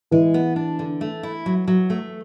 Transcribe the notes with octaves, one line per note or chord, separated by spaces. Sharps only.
E3 G#3
B3
D4
D3
A3
E4
F#3
F#3
A3